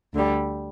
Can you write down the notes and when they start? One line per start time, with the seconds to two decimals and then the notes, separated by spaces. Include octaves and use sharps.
0.14 D2 D3 G3